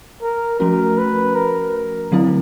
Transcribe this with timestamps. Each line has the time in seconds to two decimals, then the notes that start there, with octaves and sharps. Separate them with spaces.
0.22 A#4
0.60 F3 A3 C#4 F#4 A#4
0.98 B4
1.35 A#4
2.12 D3 F#3 A3 C4 E4